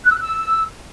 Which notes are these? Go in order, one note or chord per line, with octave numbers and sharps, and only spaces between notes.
F#6
E6
F#6
E6